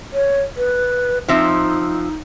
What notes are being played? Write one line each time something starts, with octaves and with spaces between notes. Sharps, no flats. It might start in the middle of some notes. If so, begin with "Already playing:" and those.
C#5
B4
F3 C4 D#4 E5